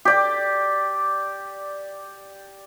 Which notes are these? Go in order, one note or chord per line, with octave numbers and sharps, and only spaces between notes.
G4 D5 G5